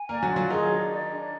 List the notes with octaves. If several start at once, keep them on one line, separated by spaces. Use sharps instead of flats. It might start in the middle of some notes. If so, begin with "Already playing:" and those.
Already playing: G#5
A#3 A#4 D5
F#3 F#4
F4
F#3 F#4
D#3 D#4 G#4
D4
D5
D4